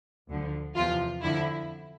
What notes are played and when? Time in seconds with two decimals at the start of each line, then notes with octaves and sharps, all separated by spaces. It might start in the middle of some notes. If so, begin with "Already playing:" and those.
0.29 D2 D3 F3
0.75 E2 C3 F3 F4
1.22 F2 D3 F3 E4